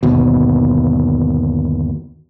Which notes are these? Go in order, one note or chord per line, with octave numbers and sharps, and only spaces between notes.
G1 D#2 B2